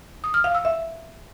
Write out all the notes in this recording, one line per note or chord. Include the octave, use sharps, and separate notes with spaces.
D#6
F6
F5
E6
E5